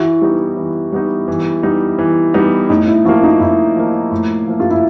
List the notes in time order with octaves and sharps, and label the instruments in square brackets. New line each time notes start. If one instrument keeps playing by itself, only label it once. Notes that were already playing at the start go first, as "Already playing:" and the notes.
Already playing: [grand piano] E3 [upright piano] E4 F#4
[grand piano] G3 B3 D#4
E3
G3 B3 D#4
E3
G3 B3 D#4
E3
G3 B3 D#4
[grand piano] A2 [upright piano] D#4
[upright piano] E4
[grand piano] F3 A#3 [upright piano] E4 F#4
[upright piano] D#4 F4
[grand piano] A2 [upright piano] E4
[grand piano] F3 A#3
A2
F3 A#3
[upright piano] F4
E4